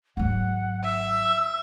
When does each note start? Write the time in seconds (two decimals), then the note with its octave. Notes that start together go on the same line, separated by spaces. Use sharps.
0.17 G#1 F#3 F#5
0.84 E5 E6